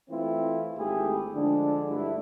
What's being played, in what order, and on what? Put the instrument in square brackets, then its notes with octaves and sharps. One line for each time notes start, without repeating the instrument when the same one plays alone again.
[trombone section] E3 A3 C4 E4 F4
G#1 A3 E4 G4 G#4
D3 F3 G#3 D4
G2 A3 D4 E4